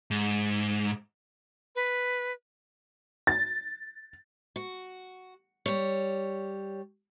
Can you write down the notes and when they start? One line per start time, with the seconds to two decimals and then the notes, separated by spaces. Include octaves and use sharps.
0.11 G#2
1.76 B4
3.27 A6
4.56 F#4
5.66 G3 C#5